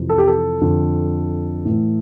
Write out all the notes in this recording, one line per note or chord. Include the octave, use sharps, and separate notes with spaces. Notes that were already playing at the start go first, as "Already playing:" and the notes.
Already playing: F2 C3 E3
A4
G4
A4
F2 D3
A2 E3